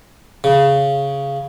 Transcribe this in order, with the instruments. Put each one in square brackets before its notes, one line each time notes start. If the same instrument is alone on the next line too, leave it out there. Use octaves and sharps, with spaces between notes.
[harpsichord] C#3